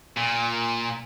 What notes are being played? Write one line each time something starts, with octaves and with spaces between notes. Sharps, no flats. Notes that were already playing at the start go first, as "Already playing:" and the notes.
A#2